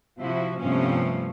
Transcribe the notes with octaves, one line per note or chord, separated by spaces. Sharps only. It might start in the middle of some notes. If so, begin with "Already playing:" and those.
C3 F3 E4 F#4
G2 C3 F3 A3 B3 C#4